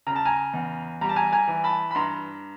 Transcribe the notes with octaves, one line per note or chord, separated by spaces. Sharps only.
C#3 A#5
A5
G#5 A#5
E2
G3 A#5
A5
G#5 A#5
G#5 A#5
E3
A5 B5
B5
G2 A#5 C6